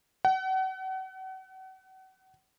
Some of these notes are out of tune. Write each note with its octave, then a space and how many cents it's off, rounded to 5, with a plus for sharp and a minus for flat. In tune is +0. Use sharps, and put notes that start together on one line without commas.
F#5 +35